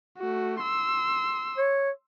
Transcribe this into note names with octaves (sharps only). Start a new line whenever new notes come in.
A3 F#4
C6 E6
C#5